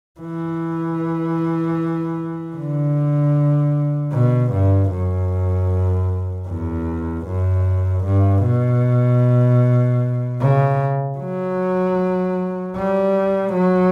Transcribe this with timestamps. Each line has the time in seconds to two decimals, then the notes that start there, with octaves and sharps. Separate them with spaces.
0.20 E3
2.55 D3
4.12 B2
4.52 G2
4.91 F#2
6.48 E2
7.26 F#2
8.05 G2
8.43 B2
10.40 C#3
11.18 F#3
12.76 G3
13.53 F#3